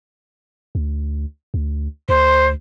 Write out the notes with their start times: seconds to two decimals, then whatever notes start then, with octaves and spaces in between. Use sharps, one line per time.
0.75 D2
1.54 D2
2.09 D2 C5